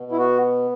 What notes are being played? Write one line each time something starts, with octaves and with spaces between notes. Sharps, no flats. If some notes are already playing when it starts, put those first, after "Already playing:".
Already playing: B2
E4
B3 F#4